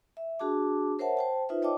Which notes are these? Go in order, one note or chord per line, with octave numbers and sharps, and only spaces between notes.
E5
D4 F#4 G#4 A5 D6
A#4 C5 C#5 E5 F#5 A5
C5 G5 A5
D#4 F4 B4 C5 E5
C#5 D#5 G5 A5 D6